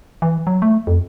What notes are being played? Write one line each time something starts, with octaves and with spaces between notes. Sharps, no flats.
E3
F#3
A3
F2